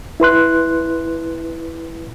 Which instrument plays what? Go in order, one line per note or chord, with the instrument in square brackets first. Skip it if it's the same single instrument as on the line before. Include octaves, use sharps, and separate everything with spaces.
[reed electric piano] E4 B4 C6 F#6